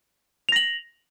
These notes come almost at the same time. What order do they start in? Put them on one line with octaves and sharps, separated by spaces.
F7 A#6 F#7